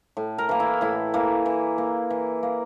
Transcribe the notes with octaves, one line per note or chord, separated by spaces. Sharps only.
A2
A#4
E3 A#3
E4
A2 E4
E3 A#3
E3
A#3
E3
A#3